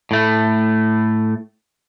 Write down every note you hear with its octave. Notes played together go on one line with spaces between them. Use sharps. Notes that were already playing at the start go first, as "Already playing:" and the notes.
A2 A3